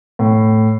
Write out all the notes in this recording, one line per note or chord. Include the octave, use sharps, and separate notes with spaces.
A2